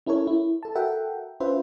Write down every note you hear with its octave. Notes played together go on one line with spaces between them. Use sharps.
C#4 E4 A4 A#4 C#5
E4
A4 A5
F#4 A4 A#4 E5 F#5 G5
C#4 F4 B4 C5 E5